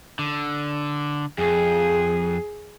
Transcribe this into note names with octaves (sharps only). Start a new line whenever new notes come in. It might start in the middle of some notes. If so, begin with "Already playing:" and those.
D3
F2 G#4